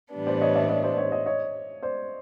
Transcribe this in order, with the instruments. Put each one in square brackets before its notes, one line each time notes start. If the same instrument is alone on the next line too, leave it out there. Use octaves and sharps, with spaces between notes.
[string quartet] A2 E3 G3 B3 D4
[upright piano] C5 D5
C#5 D#5
D5 E5
C#5 D#5
C5 D5
C#5 D#5
C#5 D#5
C#5 D#5
C5 D5